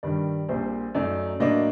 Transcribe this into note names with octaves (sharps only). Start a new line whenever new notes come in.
G2 D#3 G3 D5
A#1 A#2 G3 C4 C5
F#2 F#3 A3 D#4 D5
A2 F#3 A#3 D4 D#5